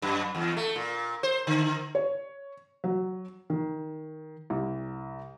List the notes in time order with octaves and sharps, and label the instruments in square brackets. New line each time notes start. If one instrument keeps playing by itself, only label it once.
[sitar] F#2
E2
A3
A#2
C5
D3
[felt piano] C#5
F#3
D#3
C2